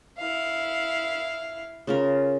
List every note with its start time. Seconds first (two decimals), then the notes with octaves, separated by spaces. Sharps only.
0.18 E4 F5
1.87 C#3 F4 A#4